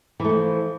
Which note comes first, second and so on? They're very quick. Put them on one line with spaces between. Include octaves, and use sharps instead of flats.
E3 A3 F3